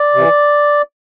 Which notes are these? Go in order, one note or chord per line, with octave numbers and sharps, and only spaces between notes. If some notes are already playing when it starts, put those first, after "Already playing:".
Already playing: D5
C3 E3